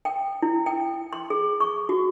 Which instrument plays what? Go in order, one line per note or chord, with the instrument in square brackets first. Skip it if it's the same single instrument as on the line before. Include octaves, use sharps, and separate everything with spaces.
[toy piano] G5
E4
G5
C6
G#4
C#6
F#4